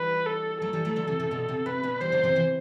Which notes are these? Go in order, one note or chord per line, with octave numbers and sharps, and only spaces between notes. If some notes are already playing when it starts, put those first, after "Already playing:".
Already playing: E3 G3 B4
A4
F#3 A3 A4
E3 G3
F#3 A3
D3 F#3
C3 E3
C3 E3
B2 D3
C3
C3 B4
B2 D3
E3 G3 C5
D3 F#3
C3 E3
C3 E3